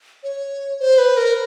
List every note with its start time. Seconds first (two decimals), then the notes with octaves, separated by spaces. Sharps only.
0.23 C#5
0.80 C5
0.98 B4
1.17 A#4